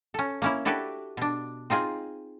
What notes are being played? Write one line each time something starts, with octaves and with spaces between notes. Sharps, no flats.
C#4 A4
A#3 C#4 E4
D4 E4 F#4 G4 A4 B4
B2 D4
C4 D#4 F4 G#4